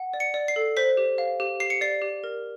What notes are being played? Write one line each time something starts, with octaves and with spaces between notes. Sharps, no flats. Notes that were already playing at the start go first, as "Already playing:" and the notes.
Already playing: F#5
D5
C#7
D5
C7
A4
C5 B6
G4
F5
G4
G4 C7
C#7
D5 C7
G4
A#4